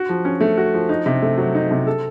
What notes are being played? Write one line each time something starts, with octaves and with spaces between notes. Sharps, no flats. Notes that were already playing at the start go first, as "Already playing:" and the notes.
Already playing: F#4
F3
C#4
A3
F#4
F3
D#4
C3
A3
F#3
D#4
C3
A4